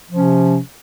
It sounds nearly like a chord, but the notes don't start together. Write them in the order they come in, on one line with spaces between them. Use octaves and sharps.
F3 C3 C#4